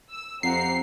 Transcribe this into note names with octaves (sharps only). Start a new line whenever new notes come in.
E6
F2 C4 G4 F#5 A#5 C7